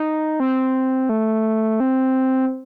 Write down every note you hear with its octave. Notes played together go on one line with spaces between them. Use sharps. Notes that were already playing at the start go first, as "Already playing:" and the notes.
Already playing: D#4
C4
A3
C4